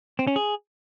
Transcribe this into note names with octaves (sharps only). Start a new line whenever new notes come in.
C4
C#4
G#4